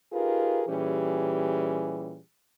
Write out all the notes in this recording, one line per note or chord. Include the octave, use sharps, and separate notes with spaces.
D#4 F4 G4 G#4 A#4 B4
A#2 E3 G3 C#4 G4 G#4